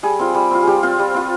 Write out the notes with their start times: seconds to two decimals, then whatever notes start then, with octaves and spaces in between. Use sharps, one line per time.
0.03 G3 G#4
0.19 C4 F4
0.34 G3
0.51 C4 F4
0.63 G3 G4 G#4
0.83 C4 F4
0.99 G3
1.14 C4 F4